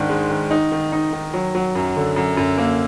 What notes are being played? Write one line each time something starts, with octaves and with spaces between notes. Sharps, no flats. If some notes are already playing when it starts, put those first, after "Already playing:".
Already playing: G#2 D#3 D4
G#3
D#3
D#4
D#3
D#4
D#3
F#3
F#3
F#2
D3
F#2
F#2
A#3